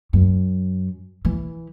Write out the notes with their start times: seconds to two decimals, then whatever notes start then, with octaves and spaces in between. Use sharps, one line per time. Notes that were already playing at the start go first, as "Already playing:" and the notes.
0.13 F#2
1.25 E3